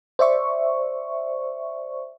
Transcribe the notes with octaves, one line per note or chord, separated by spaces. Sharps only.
C5 D5 E5 C#6